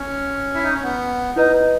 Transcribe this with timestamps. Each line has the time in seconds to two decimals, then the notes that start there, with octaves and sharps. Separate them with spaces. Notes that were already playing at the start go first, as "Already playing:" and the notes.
Already playing: C#4
0.54 E4
0.64 D#4
0.74 C#4
0.83 B3
1.36 D#4 E4 B4 D#5